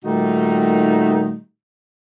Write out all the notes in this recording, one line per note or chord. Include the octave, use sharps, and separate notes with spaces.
A#2 D#3 G3 A3 D#4 F#4